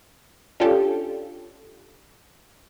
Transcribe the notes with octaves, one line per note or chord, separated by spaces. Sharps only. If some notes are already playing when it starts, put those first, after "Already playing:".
C#4 D4 F4 G4 A4